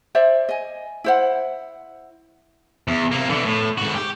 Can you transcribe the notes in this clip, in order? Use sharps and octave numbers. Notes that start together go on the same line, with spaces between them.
C5 D5 E5
D#5 G#5
E4 C5 F#5
E2
C3 A#3
D3 E3
A2
G#2 F#4
G4